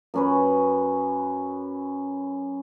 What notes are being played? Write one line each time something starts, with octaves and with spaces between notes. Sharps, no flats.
F#2 C#4 B4